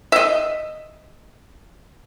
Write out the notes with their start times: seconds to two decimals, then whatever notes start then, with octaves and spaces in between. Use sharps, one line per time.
0.12 D#5 E5